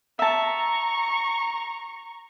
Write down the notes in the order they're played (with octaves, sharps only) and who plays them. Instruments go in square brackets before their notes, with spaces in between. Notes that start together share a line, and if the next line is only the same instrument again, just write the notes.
[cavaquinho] E5 A5 [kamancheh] A#5 C#6